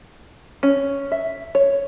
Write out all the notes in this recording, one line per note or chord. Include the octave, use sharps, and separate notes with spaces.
C#4
E5
C#5